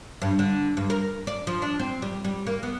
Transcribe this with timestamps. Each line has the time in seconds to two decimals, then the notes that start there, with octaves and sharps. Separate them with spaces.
0.22 G2
0.39 D3
0.77 G2
0.90 A#4
1.27 D5
1.47 F3
1.62 D4
1.79 C4
2.02 G3
2.25 G3
2.47 A#3
2.63 B3